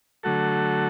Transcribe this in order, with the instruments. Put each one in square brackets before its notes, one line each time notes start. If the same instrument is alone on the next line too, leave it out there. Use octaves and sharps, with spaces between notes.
[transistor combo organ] D3 F#3 A3 F#4 A4